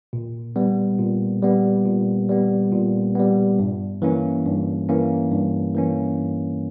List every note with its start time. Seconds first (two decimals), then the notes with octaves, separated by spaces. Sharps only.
0.13 A#2
0.56 G3 B3
0.99 A#2
1.42 G3 B3
1.86 A#2
2.29 G3 B3
2.72 A#2
3.15 G3 B3
3.59 G2
4.02 E3 A#3 C#4
4.45 G2
4.89 E3 A#3 C#4
5.32 G2
5.75 E3 A#3 C#4
6.18 G2